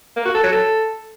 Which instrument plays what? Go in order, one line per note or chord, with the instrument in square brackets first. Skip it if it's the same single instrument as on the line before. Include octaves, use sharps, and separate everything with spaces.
[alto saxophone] A#3
F#4
A4
F#3
A4